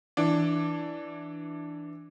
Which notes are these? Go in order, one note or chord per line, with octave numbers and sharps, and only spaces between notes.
E3 D4